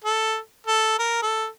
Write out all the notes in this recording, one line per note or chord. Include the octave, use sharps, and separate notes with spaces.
A4
A4
A#4
A4